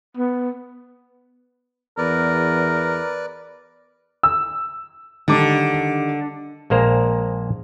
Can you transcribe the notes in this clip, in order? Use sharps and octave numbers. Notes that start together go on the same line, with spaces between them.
B3
E2 A#4 B4 D5
E6
D3 D#3 G3 D6
A#1 G#3 A#3 C5 A#5